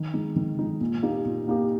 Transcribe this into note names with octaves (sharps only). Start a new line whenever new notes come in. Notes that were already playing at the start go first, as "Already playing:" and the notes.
Already playing: D#3
G#3 D#4
D#3
G#3 D#4
A#2
A#3 D#4 G4
A#2
A#3 D#4 G4